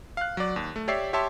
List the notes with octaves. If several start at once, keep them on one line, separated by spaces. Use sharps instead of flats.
F5 F#6
F#3 D5
D#2
A3
G4 C#5 D5 E5 C7
G4 C#5 E5 A5 C6